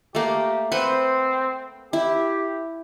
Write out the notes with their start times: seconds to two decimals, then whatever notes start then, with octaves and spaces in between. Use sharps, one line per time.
0.15 A3 A#3 G4
0.72 C4 B4 C5 F#5
1.93 E4 G4